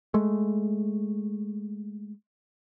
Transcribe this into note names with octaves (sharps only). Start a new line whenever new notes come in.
G#3 A3